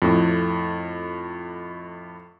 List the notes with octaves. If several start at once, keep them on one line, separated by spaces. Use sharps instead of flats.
F2 A2